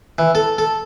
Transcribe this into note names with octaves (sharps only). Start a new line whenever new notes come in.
E3
A4
A4